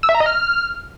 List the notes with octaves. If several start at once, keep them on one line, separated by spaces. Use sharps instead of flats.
E6
E5
A#5
D#5
F6